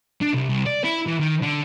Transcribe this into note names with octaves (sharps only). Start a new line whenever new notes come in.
D4
C2
C2
D5
E4
E3
D#3
D3